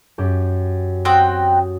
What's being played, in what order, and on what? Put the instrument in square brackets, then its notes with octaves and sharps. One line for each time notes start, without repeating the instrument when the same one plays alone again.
[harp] F#2 G4
[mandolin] C4 F#4 G5 [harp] D#6